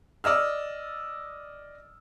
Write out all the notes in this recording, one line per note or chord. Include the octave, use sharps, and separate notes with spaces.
D5 D#5 E6 F6